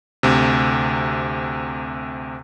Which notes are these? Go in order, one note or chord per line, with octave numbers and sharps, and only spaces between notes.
D2 C3